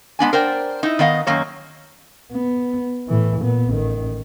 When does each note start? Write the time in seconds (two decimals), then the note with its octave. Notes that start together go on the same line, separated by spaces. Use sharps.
0.19 G#3 B3 D4 G#5
0.33 A#4 C5 D5 G5
0.83 D#4 E4
0.99 D#3 B3 D#5 F5
1.27 F#2 D#3 A#3 C#5
2.33 B3
3.08 A2 E3
3.40 A#2 B3
3.71 A1 D#3